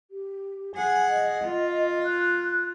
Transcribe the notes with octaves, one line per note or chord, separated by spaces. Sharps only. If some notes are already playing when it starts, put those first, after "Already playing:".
G4
G#4 F#5 G#5
D#5
F4
F#6